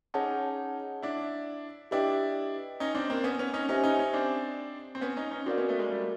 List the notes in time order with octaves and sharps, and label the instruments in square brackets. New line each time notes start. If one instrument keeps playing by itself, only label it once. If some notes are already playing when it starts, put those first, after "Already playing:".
[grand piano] C#4 D#4 [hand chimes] G#4 C#5 F#5 A5
[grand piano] D4 E4
[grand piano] D4 E4 [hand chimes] G4 B4 D#5 G5
[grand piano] C#4 D#4
C4 D4
A#3 C4
B3 C#4
B3 C#4
C#4 D#4
[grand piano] C#4 D#4 [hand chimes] G4 C5 E5 G#5
[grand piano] C#4 D#4
C#4 D#4
C4 D4
C4
B3 C#4
C#4 D#4
C#4 D#4
[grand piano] C4 D4 [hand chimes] F#4 A#4 D5 F5
[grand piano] B3 C#4
A3 B3
G#3 A#3
G3 A3